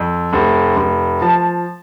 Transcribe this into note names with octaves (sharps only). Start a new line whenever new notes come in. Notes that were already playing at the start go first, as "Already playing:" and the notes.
Already playing: F2
F1
F1
F3 A5